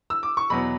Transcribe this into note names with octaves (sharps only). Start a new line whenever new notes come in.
E6
D6
C#6
E2 B2 F#3 B3 B5